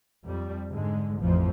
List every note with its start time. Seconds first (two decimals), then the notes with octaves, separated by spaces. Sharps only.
0.24 F2 G3
0.69 G#2 D3 G#3
1.20 A1 F2 F3